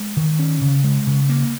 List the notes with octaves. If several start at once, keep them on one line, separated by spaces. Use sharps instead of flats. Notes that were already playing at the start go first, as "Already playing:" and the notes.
Already playing: G#3
D#3
C#4
C#3
G#3
C#3
A#3